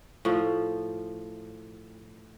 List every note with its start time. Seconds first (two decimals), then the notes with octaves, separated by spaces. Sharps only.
0.25 A2 F3